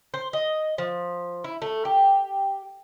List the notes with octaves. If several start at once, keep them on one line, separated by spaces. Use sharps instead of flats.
C5
D#5
F3
E4
A3
G4